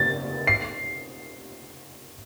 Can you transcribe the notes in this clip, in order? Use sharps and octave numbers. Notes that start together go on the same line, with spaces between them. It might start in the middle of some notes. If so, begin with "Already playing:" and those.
Already playing: A6
C7